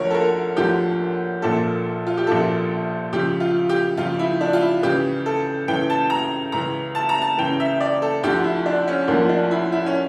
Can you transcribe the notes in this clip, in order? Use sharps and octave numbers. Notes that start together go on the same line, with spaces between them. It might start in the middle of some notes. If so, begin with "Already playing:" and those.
Already playing: D2 D3 F3 A#4 C#5
A4
A#4
D2 D3 F3 G4
A#1 A#2 F3 A4
F4
G4
A#1 A#2 F3 A4
C#2 C#3 F3 G4
F4
G4
C#2 C#3 F3 F4
E4
D4
F4
E4
C#2 C#3 E3 G4
A4
C#2 C#3 E3 G5
A5
A#5
C#2 C#3 E3 A#5
A5
A#5
A5
C#2 C#3 E3 G5
E5
D5
A4
D2 D3 F3 G4
E4
D4
C#4
D2 D3 F3 A#3
D4
E4
E4
C#4